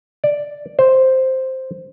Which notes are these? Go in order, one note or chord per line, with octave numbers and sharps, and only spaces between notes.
D5
C5